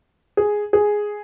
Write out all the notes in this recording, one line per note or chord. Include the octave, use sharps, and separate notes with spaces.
G#4
G#4